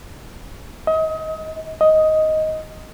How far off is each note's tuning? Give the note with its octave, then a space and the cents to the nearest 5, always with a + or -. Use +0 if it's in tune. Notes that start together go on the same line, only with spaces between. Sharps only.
D#5 +35
D#5 +10